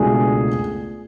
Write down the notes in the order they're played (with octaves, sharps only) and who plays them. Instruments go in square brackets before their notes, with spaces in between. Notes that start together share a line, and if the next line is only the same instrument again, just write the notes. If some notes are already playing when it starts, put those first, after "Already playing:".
Already playing: [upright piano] C#2 B2 A3 D4 G#4